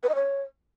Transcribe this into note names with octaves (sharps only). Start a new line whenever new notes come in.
B4
D#5
C#5